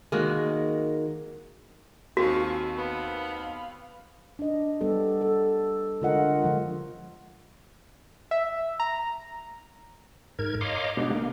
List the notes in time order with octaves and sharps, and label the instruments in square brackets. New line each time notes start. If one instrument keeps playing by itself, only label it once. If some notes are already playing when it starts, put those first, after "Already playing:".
[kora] D#3 G#3 A#3 F#4
[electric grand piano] D#2 D#3 C4 [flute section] F4 G#5 C#6 [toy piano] F#4
[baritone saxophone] B3 [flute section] F5 B5
[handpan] D4 D#5
G3 B3 G4 A4
A4
D3 G#3 F4 A#4 D#5 F#5
D3 F3 G#3
[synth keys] E5
A#5
[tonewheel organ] G#2 A#4 G#6
C#5 D#5 F5 A#5 C6 D6
B2 G#3 B3 D4 G4
A#3